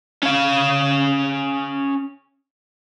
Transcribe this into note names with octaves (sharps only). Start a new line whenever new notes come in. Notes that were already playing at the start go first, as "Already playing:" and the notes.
C#4 F5